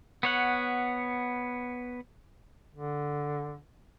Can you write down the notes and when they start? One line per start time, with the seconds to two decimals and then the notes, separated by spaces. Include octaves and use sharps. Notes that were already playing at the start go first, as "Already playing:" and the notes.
0.23 B3 C#5 F#5
2.74 D3